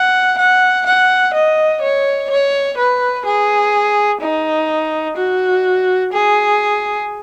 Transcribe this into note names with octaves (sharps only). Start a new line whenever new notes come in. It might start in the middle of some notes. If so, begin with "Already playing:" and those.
Already playing: F#5
F#5
F#5
D#5
C#5
C#5
B4
G#4
D#4
F#4
G#4